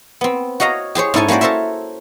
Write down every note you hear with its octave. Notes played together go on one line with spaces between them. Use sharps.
B3 C4
F#4 C#5 D#5 F5 A#5
G4 G#4 C5 C#5
G#2 C#4 E4 A4 C#5 G#5
A#3 C#4 F#4 C5 D5
A4 A#4 C5 C#5 E5